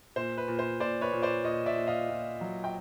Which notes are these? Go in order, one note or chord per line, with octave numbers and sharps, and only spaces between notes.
A#2 C5
B4
A#2
C5
A#2 C5 D5
B4 C#5
A#2
C5 D5
A#2 C#5 D#5
D5 E5
A#2
D#5 F5
A#2
F#3
G5